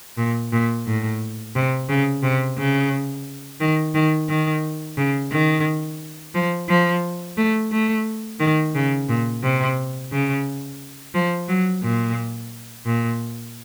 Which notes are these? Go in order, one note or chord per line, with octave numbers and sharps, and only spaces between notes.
A#2
A#2
A2
C3
C#3
C3
C#3
D#3
D#3
D#3
C#3
D#3
F3
F3
A3
A3
D#3
C#3
A#2
C3
C#3
F3
F#3
A#2
A#2